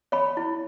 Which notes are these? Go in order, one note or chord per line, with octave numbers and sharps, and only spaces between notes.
C#5 B5
E4